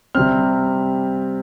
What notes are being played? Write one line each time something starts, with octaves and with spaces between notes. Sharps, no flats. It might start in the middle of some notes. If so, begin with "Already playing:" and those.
C3 G3 C4 F6